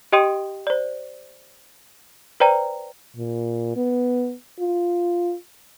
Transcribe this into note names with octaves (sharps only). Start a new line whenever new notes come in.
G4 D#5 G5 C6 D#6 D#7
C5 D5
B4 C5 D5 G5 A#5
A#2
B3
F4